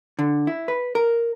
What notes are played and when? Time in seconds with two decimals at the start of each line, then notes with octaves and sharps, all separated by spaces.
0.19 D3
0.47 E4
0.68 B4
0.95 A#4